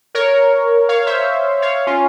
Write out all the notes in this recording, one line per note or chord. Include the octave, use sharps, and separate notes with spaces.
A#4 C#5
C#5 F5
C5 E5
C#5 F5
C#4 F4